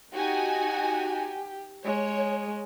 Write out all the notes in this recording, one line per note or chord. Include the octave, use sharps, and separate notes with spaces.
D#4 F#4 G4 G#5
G#3 C#5